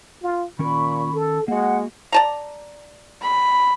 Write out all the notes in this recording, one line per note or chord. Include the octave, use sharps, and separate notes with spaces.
F4
A#2 D#3 C#4 A#4 B5 C#6
A4
G#3 A#3 F#4 F#5
D5 A5 A#5
B5